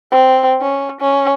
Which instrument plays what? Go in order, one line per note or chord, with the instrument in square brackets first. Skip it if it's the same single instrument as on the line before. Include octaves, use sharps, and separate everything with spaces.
[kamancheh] C4
C#4
C#4